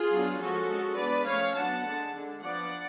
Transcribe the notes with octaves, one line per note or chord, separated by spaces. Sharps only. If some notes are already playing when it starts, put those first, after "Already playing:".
Already playing: F4 G#4
F#3 B3 D4
F3 G#3 C#4 F#4 A4
G#3 C#4
G#3 B3 D4 B4 D5
F3 A3 C#4 C#5 F5
F#3 B3 D4 F#5 A5
D3 G#3 D4
D3 G#3 D4
F3 B3 D4 D5 F#5